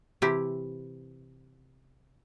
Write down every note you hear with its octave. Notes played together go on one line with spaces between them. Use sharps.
C3 E3 E4 G4